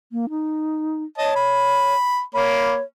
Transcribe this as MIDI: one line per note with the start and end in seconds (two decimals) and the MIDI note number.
0.12 0.26 58
0.30 1.04 63
1.18 1.95 73
1.18 1.32 75
1.18 1.32 81
1.36 2.21 83
2.34 2.77 58
2.34 2.82 73
2.34 2.77 83